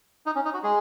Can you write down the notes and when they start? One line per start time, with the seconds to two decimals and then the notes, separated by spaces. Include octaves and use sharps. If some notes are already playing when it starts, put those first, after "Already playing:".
0.26 D#4
0.35 C#4
0.45 D#4
0.54 F#4
0.63 G#3 G#4